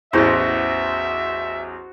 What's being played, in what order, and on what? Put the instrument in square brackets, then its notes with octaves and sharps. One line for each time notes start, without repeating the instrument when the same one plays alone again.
[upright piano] A1 E2 [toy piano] E4 B4 [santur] F#4 C5 [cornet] E5